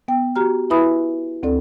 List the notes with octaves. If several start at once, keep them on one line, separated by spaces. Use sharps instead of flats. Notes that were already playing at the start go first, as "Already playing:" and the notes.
B3 G5
F#4 G4 A#5 F6
E4 B4 E5 G#5 B5 D#6
D2 C4 A4 D5